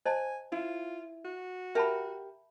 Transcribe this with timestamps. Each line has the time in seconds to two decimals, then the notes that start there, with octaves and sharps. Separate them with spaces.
0.06 C5 D#5 G#5 A5
0.52 E4 F4
1.25 F#4
1.75 G4 A#4 E5 A5 B5